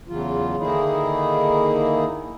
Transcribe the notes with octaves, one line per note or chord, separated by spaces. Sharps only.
E2 C#3 E3 F#3 F4
D3 D#3 A#3 D#4 E4 G#4